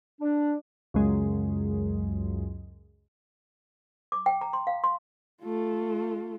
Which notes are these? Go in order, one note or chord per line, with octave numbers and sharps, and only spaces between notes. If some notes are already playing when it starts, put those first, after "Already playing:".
D4
C#2 F#2 G#3
D6
G5
A#5
C6
F5
C6
A3 F4